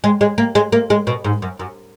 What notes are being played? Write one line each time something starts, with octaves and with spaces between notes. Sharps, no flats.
G#3
G#3
A#3
G#3
A#3
G#3
B2
G#2
F#2
F#2